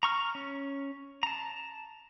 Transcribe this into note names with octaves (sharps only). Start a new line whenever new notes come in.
A#5 C#6 F6
C#4
A5 A#5